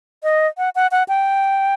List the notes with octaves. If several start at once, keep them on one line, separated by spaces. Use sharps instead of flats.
D#5
F#5
F#5
F#5
G5